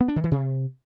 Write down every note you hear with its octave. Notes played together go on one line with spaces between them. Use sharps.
B3
D4
D#3
E3
C3